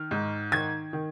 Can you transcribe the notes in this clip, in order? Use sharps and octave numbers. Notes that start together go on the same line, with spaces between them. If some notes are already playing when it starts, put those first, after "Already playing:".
Already playing: D#3 F6
G#2
D#3 G#6
D#3